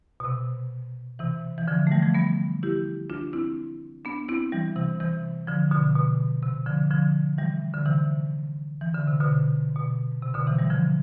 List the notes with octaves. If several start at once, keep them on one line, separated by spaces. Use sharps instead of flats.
B2
C3
C3 E3
E3
D3 F3
A3
E3 G3
F3 A3
G3 B3
E4 G4
D4 F4
C4 E4
B3 D4
C4 E4
E3 G3
C3 E3
C3 E3
D3 F3
B2 D3
B2
C3
D3 F3
D3 F3
E3 G3
D3
C3 E3
E3
D3
C3
B2 D3
B2
C3
B2 D3
C3 E3
E3 G3
D3 F3